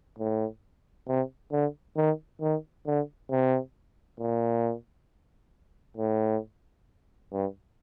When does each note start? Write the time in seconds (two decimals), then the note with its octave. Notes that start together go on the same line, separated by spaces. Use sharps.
0.19 A2
1.08 C3
1.52 D3
1.96 D#3
2.41 D#3
2.86 D3
3.31 C3
4.20 A#2
5.97 A2
7.32 G2